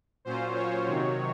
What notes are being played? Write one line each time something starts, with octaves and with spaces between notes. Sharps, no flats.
A#2 F#3 C#4 F4 C5
C#5
C3 D#3 F#3